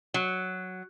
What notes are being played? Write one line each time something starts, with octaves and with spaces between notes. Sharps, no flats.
F#3